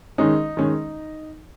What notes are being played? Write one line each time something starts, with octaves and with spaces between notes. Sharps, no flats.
D#3 G#3 C#4 D#4
D#3 G#3 C#4